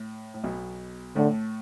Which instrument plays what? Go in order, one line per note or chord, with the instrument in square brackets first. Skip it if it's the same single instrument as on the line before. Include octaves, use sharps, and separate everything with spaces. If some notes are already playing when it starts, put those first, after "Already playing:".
Already playing: [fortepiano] A2
A2
B1 B2
[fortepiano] A2 A3 [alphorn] D3